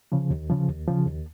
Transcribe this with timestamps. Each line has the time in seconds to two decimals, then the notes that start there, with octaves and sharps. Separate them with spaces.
0.12 C#3 F3
0.30 D#2
0.49 C#3 F3
0.68 D#2
0.87 C#3 F3
1.06 D#2